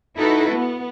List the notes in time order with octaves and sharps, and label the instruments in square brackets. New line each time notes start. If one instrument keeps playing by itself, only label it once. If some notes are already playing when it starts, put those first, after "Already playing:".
[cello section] D#4 E4 F#4 A4 B4
B3